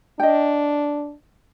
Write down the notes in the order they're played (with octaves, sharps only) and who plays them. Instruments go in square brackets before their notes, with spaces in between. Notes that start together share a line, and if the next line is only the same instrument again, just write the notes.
[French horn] D4 [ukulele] D#5 G5